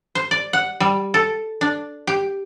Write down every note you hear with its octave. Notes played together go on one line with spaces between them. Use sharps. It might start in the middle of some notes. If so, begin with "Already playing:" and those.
C5
D5
F#5
G3
A4
D4
G4